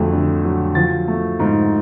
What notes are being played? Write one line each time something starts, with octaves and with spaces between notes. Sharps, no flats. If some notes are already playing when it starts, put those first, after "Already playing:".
Already playing: F2 D3 F#3 A3
D3
F#3
F3 A6
A3
G#2